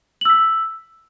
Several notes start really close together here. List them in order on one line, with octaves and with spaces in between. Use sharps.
F#7 E6 B6